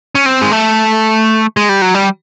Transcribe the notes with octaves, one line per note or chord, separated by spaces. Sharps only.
C#4
C4
G#3
A3
G#3
G3
F#3
G3